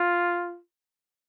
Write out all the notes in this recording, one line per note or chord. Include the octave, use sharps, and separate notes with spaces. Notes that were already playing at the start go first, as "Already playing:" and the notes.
Already playing: F4